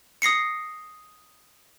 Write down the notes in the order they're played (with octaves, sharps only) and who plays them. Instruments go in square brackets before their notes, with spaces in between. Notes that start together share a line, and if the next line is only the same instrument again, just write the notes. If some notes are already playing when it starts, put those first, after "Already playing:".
[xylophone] D#6 A#6 C7 C#7